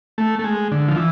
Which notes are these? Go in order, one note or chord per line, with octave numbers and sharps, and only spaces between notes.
A3
A3
G#3
D3
F3
E3